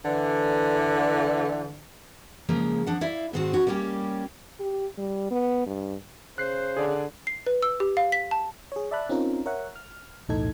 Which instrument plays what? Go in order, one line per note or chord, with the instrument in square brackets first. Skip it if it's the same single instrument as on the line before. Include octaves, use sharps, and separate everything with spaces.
[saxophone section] D3 E3
[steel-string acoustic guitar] C#3 F3 G#3 A#3
F3 D4 F#5
E4 D5 E5 F5
G#2 D#3 C4 F4 F#4
C#4 F#4
G3 A#3 C#4 E4 G4
[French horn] G4
G3
B3
G2
[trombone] C#3 [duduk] C5 [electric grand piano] F#6 C7
[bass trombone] D3 [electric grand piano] G#4 D5
[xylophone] C7
B4
E6
G4
F5
B6
A5
[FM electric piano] G#4 C#5
D5 E5 A5 B5 F#6
C4 C#4 D#4 F4 A#4
A#4 C#5 E5 F#5
F6
B1 E2 A2 D#4 A4 G#6